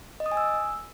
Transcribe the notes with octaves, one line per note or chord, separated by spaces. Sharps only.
D#5
D#6
G#5
E6